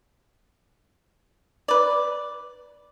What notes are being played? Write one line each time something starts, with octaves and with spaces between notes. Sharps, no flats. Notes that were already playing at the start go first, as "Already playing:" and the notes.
B4 D5